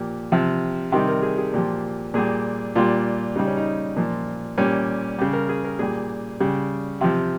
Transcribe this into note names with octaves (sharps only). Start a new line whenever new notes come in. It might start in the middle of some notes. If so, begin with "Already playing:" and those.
Already playing: A#2 F3 G4
C3 F3
C3 D#3 G3 G4
A#4
G#4
G#4
A#2 F3 G4
A#2 G3 G#4
A#2 G3 F4
C#3 G3 D#4
C#4
D#4
A#2 F3
A#2 G3 C#4
C#3 G3 G4
A#4
G#4
A#4
A#2 G3 G#4
C#3 G3
C3 F3 G4